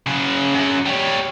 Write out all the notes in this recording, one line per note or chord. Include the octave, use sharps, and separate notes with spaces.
C#3 F#3
F#2 F#3
G3 C#5